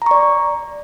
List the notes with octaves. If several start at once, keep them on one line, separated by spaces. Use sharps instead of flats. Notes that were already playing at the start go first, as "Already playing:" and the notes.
D5 A#5 C#6